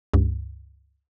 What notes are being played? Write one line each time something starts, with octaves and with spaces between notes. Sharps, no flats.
C#2 G2